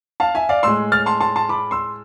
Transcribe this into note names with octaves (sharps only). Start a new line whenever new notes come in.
F5 A5
E5 G#5
D5 F5
A2 G#3 C6 E6
F6 A6
A5 C6
A5 C6
A5 C6
B5 D6
C6 E6